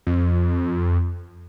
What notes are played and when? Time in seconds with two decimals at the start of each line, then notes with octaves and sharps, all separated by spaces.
0.07 F2